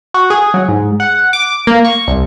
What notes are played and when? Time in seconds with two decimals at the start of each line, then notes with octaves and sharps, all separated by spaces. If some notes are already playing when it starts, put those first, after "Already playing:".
0.14 F#4
0.30 G#4
0.54 F#3
0.68 G#2
1.00 F#5
1.33 D6
1.67 A#3
1.84 C#6
2.08 C2